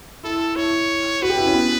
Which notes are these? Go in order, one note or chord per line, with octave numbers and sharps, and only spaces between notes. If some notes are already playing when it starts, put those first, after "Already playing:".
E4 A4
E4 C#5
F#4 B4
G4
E4
C#4
B3